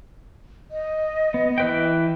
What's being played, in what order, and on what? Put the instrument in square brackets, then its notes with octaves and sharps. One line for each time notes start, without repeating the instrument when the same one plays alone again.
[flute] D#5
[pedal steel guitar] B3
E3 B4 G5